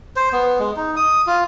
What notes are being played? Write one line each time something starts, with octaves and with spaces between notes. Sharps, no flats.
C5
B3
G#3
D#4
D#6
F4